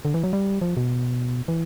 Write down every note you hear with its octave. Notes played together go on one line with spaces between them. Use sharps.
D3
E3
F#3
G3
F3
B2
E3